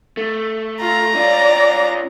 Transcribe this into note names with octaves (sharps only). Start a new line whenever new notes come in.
A3
F4 A#5
C#4 F4 D5